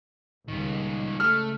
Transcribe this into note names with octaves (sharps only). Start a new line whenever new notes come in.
C#2 D#3 G3
A3 F6